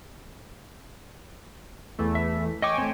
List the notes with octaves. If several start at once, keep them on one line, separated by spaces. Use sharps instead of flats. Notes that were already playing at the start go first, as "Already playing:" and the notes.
E2 E3 A3
E5
C#5 D#5 G5 G#5 D6
A3 C4